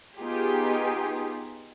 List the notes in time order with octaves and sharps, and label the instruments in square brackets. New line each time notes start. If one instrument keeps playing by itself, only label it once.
[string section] B3 D#4 F4 G4 G#4